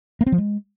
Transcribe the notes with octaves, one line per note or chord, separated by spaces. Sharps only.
A#3
C4
F3
G#3